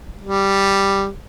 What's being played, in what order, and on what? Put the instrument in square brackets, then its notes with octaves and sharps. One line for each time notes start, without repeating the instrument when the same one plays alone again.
[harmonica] G3